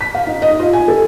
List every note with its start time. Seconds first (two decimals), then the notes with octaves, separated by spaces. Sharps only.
0.01 B6
0.15 F5
0.27 D#4
0.42 D#5
0.60 F4
0.73 G#5
0.88 A4